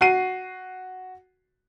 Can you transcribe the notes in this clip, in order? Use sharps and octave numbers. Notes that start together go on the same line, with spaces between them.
F#4 C7 D#7